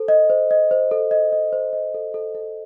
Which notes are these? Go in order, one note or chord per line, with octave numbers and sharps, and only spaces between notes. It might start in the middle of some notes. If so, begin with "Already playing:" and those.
Already playing: A4 C5
D#5
C5
D#5
C5
A4
D#5
D#5
C5
D#5
A4
A4
A4